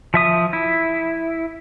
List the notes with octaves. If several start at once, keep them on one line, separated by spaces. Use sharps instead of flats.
F3 E5 D#6
E4